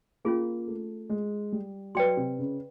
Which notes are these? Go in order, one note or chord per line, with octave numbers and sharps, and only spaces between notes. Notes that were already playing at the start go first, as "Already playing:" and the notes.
A#3 C#4 F4 G#4
A3
G#3
G3
F#3 B4 D5 G5 C6
C3
C#3